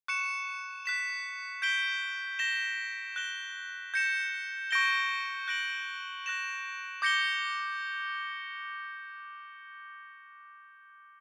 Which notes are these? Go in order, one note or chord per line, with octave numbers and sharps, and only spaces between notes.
C#6 F#6 C#7 E7
F#6 B6 E7
G6 B6 D7 G7
A#6 E7 G7
F#6 A#6 E7 G7
G6 A#6 C#7 E7
C#6 G6 A#6 D7 G7
F#6 A#6 D7 F#7
F#6 A#6 E7
D6 G6 A#6 C#7 G7